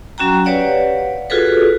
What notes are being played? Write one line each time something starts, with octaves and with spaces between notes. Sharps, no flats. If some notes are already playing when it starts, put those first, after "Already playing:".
F#3 C#4 F#4 G5 A#5
G4 B4 C#5 D5 F5 F#5
F4 F#4 G#4 A4 B4